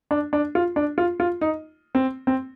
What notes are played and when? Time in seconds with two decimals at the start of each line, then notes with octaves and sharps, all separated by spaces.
0.11 D4
0.33 D4
0.55 F4
0.76 D4
0.98 F4
1.20 F4
1.41 D#4
1.95 C4
2.27 C4